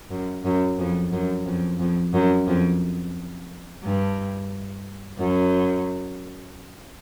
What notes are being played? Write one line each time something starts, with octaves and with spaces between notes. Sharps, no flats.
F#2
F#2
F2
F#2
F2
F2
F#2
F2
G2
F#2